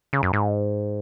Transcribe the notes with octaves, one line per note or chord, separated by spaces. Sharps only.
C#3
F#2
G#2